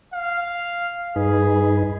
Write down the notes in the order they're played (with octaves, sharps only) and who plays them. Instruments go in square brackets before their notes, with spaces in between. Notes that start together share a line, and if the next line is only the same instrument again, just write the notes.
[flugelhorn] F5
[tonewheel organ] G2 D#4 B4 [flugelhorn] G#4